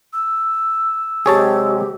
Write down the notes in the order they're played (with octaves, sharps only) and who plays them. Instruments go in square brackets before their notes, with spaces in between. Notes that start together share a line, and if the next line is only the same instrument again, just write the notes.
[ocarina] E6
[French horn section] C3 F#3 G#3 [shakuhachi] G4 [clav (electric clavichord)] G#4 C#5 A5